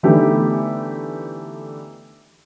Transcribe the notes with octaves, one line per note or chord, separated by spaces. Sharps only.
D3 E3 A3 B3 D#4 G4